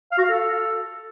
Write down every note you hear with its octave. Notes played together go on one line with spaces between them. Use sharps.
F5
F#4
F5
A4